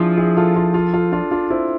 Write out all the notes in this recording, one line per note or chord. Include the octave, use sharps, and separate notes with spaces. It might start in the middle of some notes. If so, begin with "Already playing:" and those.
Already playing: F3 D4 E4 F4 G#4
E4 G#4
F4 A4
F4 A4
F4 A4
F4 A4
D4 F4
D4 F4
C4 E4